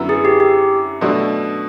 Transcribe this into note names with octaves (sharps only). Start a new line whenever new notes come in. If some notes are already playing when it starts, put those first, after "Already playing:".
Already playing: F#2 D3 F#3 B3 E4
G#4
G4
G4
B2 F#3 A3 D4